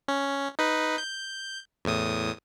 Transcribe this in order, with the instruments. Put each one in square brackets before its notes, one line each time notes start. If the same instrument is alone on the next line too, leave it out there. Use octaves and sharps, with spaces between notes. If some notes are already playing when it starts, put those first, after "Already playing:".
[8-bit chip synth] C#4
D#4 B4
G6
E2 A2 D#6